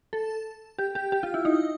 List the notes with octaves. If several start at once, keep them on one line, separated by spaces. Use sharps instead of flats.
A4
G4
G4
G4
F4
E4
D#4